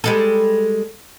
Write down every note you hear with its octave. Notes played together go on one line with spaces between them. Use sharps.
G3 G#3 A4